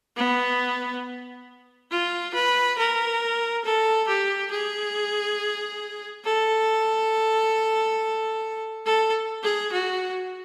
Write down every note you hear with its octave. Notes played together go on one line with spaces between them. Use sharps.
B3
F4
B4
A#4
A4
G4
G#4
A4
A4
G#4
F#4